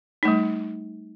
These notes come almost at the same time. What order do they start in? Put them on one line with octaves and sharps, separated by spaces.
D#4 A3 G3